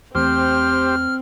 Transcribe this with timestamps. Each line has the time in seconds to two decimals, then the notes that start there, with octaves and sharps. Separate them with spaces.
0.15 E2 E3 A3 C4 G4 C5 F6